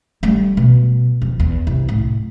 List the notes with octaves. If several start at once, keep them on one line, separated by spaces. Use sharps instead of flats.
G3 A3
B2
F2
E2
C2
A2